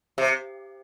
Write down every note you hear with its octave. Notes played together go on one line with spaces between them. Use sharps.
C3